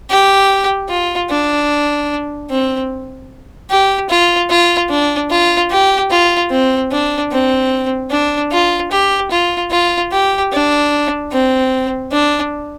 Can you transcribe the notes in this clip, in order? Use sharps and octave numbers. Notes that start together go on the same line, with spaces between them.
G4
F4
D4
C4
G4
F4
F4
D4
F4
G4
F4
C4
D4
C4
D4
F4
G4
F4
F4
G4
D4
C4
D4